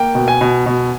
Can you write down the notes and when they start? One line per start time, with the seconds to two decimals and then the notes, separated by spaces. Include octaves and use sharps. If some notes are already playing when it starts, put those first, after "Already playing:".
Already playing: A#3 G5
0.15 B2
0.28 G#5
0.41 B2
0.66 B2